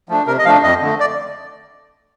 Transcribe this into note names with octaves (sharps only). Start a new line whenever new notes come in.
F3 A3 D4
C3 A#4
D#5
F3 A3 D4 F5
F2 D#5
D3 A3
D5